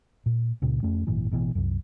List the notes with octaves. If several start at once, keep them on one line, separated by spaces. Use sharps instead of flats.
A#2
C#2 A#2 C#3
F2 A3 C#4
G#1 F#2 A#2 E3
A1 B2 D#3 E3
C2 F#2